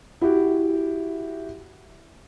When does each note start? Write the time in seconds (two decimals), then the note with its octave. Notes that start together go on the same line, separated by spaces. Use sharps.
0.21 E4 F#4 G4